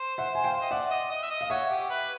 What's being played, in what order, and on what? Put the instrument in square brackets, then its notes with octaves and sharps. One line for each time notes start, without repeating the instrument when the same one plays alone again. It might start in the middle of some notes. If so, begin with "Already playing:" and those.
Already playing: [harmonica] C5
[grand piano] E5 F#5
G#5
F5 G5
[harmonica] D#5
[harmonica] D5 [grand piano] E5 F#5
[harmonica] D#5
D#5
E5
D#5
[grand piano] F5
[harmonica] C#5 [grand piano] E5 F#5
[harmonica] G4
B4